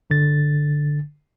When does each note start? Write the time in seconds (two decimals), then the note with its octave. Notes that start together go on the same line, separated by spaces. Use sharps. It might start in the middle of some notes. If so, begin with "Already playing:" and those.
0.10 G1 D3 A6